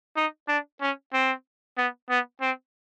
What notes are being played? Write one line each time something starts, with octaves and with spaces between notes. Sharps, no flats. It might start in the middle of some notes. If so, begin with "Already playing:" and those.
D#4
D4
C#4
C4
B3
B3
C4